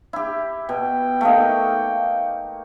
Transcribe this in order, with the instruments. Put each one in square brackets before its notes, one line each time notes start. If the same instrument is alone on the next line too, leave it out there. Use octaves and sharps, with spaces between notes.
[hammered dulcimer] E4 G4
[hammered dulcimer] B2 [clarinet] G5
[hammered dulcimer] A3 A#3 D#4